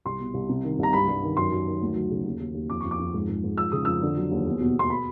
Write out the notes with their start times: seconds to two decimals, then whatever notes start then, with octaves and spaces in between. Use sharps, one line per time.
0.05 C2 C6
0.20 B2
0.34 C2
0.49 C3
0.64 D#3
0.79 C2 A#5
0.93 G2 B5
1.08 G2
1.23 D#3
1.37 F#2 C6
1.52 F#2
1.67 D#3
1.82 D2
1.96 F#3
2.11 C#3
2.25 D#2
2.40 D#2
2.55 D#2
2.70 F2 D6
2.81 F2 C#6
2.91 D6
2.99 F2
3.14 G#2
3.29 G#2
3.44 G#2
3.58 F3 E6
3.72 C#3 D#6
3.85 F2 E6
4.02 D3
4.17 F#3
4.31 D#2
4.46 E2
4.60 B2
4.76 B2 C6
4.90 B5